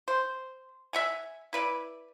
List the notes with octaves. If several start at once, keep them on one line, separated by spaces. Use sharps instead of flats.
C5
E5 F#5 G#5
E4 B4 D5